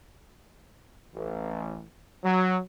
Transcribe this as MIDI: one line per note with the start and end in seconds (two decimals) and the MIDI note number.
1.14 1.81 33
2.24 2.58 54